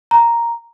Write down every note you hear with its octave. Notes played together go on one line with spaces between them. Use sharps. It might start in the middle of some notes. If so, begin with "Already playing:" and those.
A#5